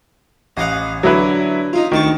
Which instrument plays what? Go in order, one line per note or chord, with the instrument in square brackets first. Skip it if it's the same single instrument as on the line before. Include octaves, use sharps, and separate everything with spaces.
[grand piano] A1 [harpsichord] D#5 F5 F#5
[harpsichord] D3 [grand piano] F#3 E4 B4
[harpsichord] D#4 F4
[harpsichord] D2 A5 C#6 [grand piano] D#3